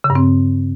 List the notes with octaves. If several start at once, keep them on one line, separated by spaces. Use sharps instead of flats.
C#3
G2
C4